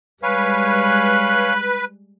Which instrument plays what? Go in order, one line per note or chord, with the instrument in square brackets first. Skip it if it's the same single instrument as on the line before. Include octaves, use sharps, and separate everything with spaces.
[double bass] G3 G#3 [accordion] B4 [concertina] C#5 F5 G#5
[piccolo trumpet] F#6